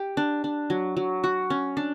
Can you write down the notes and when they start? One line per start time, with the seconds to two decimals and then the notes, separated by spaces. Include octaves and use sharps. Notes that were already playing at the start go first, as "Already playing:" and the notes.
Already playing: G4
0.17 D4
0.44 D4
0.70 F#3
0.97 F#3
1.24 F#4
1.50 C#4
1.77 D4